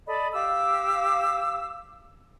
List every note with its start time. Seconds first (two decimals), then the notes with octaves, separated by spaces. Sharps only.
0.07 A4 D5 D#5 B5
0.34 G4 F5 D6 E6